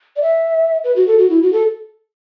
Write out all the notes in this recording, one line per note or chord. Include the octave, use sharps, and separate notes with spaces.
D5
E5
B4
F#4
A4
F#4
E4
F#4
A4